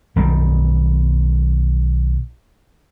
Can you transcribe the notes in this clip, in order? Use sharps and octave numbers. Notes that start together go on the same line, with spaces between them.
B1 D#3 G3